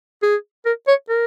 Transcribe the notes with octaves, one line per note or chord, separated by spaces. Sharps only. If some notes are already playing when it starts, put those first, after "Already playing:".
G#4
A#4
C#5
A#4